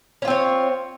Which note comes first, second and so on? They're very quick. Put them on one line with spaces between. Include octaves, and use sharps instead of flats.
C#4 F4 C4 C#5